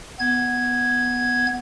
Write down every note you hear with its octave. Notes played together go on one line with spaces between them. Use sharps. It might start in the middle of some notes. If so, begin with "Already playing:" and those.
B3 G#6